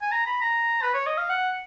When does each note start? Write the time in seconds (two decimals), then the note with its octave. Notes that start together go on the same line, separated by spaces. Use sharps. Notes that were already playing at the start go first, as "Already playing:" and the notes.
0.02 G#5
0.11 A#5
0.26 B5
0.41 A#5
0.82 B4
0.94 C#5
1.06 D#5
1.18 F5
1.30 F#5